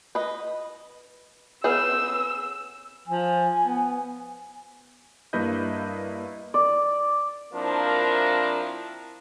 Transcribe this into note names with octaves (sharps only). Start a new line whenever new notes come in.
B4 D#5
B3 G#4 B4 C#5 E6
F3 G#5
B3
G2 A#3 E4 B4 D#5 G6
D5
F3 A#3 C4 D4 E4 A#4